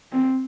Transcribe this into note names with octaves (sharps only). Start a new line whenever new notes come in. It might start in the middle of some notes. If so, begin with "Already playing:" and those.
C4